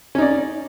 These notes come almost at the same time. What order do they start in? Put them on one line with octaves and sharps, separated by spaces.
C#4 D#4 D5